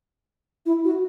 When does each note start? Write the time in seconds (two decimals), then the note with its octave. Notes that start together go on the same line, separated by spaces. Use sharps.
0.66 E4
0.85 F#4